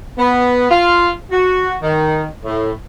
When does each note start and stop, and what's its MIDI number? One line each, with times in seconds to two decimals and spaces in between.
0.18 0.68 59
0.70 1.10 65
1.32 1.76 66
1.82 2.24 51
2.44 2.71 45